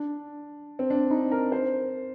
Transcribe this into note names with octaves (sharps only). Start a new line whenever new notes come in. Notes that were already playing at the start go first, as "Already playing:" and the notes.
Already playing: D4
C4
D4
D#4
A#4
C5